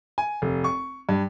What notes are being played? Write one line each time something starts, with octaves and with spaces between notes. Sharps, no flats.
G#5
F1
C#6
G2